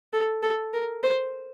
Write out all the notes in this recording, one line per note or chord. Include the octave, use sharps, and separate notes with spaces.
A4
A4
A#4
C5